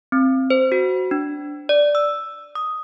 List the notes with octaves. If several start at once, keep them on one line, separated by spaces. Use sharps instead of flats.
C4
C5
F#4
D4
D5
E6
D#6